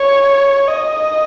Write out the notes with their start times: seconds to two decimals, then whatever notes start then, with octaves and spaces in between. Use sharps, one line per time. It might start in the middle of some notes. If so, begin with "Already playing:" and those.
Already playing: C#5
0.67 D#5